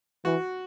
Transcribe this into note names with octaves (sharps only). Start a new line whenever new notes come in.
E3 F#4